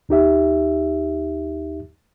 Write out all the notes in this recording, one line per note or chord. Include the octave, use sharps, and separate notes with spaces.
D#2 D#4 G4 E5